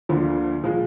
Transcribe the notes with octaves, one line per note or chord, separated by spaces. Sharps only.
D2 D3 F3 A#3
A#2 F3 G#3